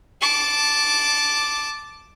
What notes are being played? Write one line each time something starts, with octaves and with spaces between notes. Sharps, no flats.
A5 D6